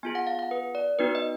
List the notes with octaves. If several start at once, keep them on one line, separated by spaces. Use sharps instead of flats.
B3 F4 G#4 G#5
F#5
F5
F#5
B4
D5
B3 D#4 F#4 B4
D#5